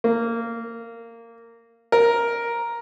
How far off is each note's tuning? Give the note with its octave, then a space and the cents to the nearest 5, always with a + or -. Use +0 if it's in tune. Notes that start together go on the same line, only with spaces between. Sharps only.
A#3 -15
A#4 +5